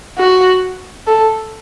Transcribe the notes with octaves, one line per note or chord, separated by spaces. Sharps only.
F#4
A4